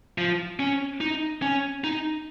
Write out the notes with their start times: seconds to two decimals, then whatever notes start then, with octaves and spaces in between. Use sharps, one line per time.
0.18 F3
0.59 C#4
1.01 D#4
1.42 C#4
1.84 D#4